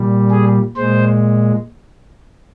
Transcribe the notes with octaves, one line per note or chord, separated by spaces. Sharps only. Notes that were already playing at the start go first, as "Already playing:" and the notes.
Already playing: A#2 G3
G#4
A#2 G#3 C5